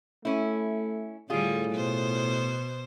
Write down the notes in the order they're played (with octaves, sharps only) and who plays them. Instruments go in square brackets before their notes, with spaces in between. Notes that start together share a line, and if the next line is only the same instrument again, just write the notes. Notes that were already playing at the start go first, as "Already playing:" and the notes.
[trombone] A3 [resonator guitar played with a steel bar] C#4 E4
[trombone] A2 [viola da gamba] D3 G3 [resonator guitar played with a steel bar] F4 G#4
[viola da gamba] B2 C5